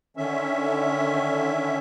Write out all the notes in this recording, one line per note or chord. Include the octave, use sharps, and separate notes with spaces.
D3 D#3 C#4 E5